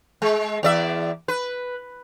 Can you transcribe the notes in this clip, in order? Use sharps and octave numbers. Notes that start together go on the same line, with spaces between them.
G#3
E2 D5 E5
B4